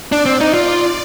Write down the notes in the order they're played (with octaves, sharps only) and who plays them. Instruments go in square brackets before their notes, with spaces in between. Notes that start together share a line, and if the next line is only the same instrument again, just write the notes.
[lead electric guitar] D4 [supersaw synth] D5
[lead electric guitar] C4
D#4
F4